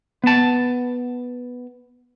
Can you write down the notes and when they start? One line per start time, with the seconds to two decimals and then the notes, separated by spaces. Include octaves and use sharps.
0.24 B3 A5